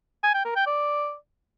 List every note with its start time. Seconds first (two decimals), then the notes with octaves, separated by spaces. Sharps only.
0.23 G#5
0.34 G5
0.45 A#4
0.56 G5
0.67 D5